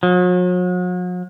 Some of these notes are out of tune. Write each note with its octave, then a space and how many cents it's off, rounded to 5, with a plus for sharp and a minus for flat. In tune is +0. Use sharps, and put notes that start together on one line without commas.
F#3 -45